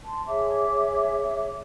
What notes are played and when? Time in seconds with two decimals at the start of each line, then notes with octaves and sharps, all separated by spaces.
0.06 A5 C6
0.27 G#4 C#5 E5 D6